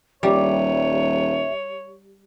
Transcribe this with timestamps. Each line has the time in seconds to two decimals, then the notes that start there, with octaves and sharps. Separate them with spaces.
0.23 D#1 G3 C#5 E5